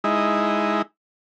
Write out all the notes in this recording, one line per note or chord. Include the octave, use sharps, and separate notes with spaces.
G#3 D#4 E4